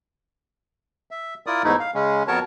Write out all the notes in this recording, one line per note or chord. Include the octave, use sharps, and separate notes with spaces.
E5
E4 F4 A#4 D5 D#6
E2 G#2 A3 D#4 E4
F5
C#3 G#3 C#4
F2 B3 F#4 A#4 C#5 A5